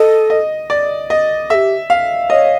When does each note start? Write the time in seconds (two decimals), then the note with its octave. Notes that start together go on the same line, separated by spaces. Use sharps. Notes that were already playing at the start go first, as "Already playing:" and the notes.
Already playing: A4 D#5
0.30 D#5
0.70 D5
1.10 D#5
1.50 G4 A4 E5
1.90 F5
2.29 C#5 D#5